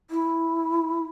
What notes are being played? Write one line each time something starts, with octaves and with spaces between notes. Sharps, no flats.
E4